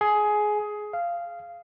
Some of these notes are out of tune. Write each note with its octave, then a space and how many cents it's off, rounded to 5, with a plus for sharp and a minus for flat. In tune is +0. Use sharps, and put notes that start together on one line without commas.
G#4 +15
F5 -15